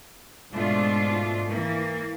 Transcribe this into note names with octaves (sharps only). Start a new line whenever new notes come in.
G#2 B2 A3 D4 F4
E3 A#3